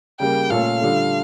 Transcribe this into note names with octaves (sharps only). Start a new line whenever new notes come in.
C#3 G3 A#3 G5
A#2 A3 C#4 F4 A4 F5
D3 G3 D4 F4 A4